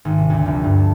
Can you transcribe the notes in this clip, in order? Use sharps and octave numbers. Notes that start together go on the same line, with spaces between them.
G#1
C3
D2
F1
G2
A5